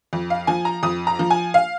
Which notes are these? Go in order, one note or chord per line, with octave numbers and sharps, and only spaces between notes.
F2
F5
F3 G#5
A#5
F2 D#6
A#5
F3
G#5
F5